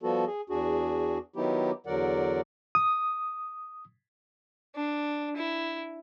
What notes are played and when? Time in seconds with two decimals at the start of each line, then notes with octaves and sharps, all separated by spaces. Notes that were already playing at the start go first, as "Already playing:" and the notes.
0.03 F3 G3 B3 F#4 A4
0.27 G#4
0.50 E2 D4 F#4 G#4
1.36 D#3 F#3 B3 D#4 E4 G4
1.86 E2 D3 F#3 A#4 D5 F#5
2.75 D#6
4.76 D4
5.37 E4